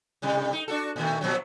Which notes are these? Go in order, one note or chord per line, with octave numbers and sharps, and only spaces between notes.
A2 C3 G3
D#4
D4 F#4 A4
A#2 D#3 A3
A#2 F3 F#3